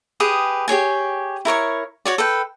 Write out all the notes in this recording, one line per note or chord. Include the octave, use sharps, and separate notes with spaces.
G4 G#4 B4 D#6
G4 G#4 C#5 G#5
E4 A#4 C#5 C#6
F#4 C#5 D5
A4 B4 G5